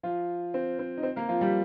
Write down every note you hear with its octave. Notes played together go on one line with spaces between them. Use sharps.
F3 F4
C4
C4
D#4
C4
A#3 A#4
F3 F4
G3 G4